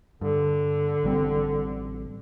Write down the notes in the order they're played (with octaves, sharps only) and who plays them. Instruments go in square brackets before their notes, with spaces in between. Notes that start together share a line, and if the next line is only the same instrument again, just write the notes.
[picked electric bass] G2 [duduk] D3
[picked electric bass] A1 G3 C4